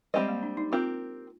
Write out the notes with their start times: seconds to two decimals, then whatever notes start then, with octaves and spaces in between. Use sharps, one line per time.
0.14 G3 G#3 C4 G4 C5 D#5
0.29 A#3
0.43 D4
0.57 D#4
0.72 C4 F4 G4 A#4